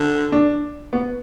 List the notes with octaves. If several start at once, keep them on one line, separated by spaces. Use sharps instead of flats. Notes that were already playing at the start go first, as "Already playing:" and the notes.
Already playing: D3
D4
B3